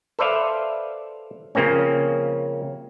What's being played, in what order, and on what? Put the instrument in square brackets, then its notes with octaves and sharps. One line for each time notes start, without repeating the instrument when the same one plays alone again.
[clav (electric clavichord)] A4 B4 C5 D5 E5 F5
C#3 F3 A#3 C4 C#4